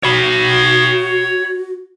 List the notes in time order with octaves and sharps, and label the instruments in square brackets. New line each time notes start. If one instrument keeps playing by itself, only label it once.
[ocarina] F#4 [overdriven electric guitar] C#5 B5